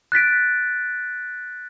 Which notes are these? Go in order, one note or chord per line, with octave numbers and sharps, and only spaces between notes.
F#6 A6 B6 D7